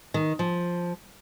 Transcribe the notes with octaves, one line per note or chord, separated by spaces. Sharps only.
D#3
F3